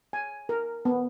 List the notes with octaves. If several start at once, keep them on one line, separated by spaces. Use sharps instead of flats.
G#5
A#4
B3